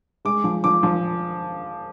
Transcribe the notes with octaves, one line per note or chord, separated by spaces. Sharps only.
G#3 D6
F3
F3 D6
F3